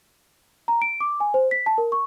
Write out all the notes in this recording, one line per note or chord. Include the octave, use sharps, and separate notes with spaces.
A#5
D7
D6
G#5
C5
B6
A5
A#4
C#6